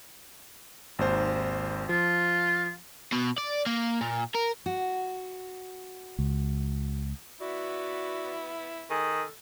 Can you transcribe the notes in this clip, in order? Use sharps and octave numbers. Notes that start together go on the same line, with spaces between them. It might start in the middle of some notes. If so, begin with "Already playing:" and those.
G#1 D#2 C5
F3 F4
B2
D5
A#3
A#2
A#4
F#4
C#2
B3 E4 F#4 D5
D#3 G#4 A4